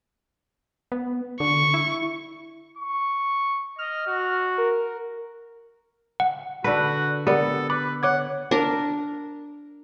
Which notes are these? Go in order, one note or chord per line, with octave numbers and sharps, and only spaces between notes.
B3
D3 C#6
E4
C#6
D#5 F6
F#4
A#4
F#5
D3 F#4 B4
B3 G4 A4 A#4 D5
B4 B5 D6
C#5 F#5 D6 G#6
D4 A#4